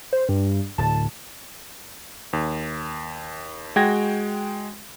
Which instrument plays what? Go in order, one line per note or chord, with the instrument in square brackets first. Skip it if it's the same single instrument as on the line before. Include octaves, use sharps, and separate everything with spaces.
[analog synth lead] C5
G2
[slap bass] D1 [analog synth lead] A5
[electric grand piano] D#2
G#3 F#4 G5 G#6 A#6